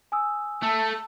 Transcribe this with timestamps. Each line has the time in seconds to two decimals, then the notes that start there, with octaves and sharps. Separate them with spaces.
0.12 G#5 D#6 E6
0.63 A3 A5 E6